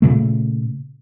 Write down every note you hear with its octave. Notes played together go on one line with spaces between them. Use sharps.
A#2 C#3 A3